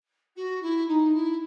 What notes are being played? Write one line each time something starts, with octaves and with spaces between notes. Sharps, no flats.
F#4
E4
D#4
E4